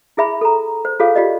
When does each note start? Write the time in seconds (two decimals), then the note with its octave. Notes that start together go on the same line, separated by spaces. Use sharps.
0.17 E4 G#4 E5 B5
0.41 A4 A#5
0.85 C5
1.00 F4 G#4 A4 C#5 F5
1.15 F4 G4 D5 D#5